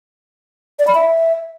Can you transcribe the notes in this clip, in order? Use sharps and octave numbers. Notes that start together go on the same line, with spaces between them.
D5
B5
E5